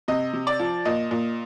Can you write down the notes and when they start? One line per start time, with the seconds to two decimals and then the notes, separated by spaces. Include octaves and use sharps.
0.08 C3 D#5
0.33 C3
0.47 D5
0.59 F3
0.85 A#2 D#5
1.11 A#2